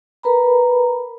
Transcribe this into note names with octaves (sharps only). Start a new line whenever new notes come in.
A#4 B4 A#5 B5